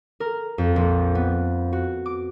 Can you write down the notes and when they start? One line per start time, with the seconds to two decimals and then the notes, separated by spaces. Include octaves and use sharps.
0.20 A#4
0.58 F2
0.76 A#1
1.15 B3
1.73 F#4
2.06 D6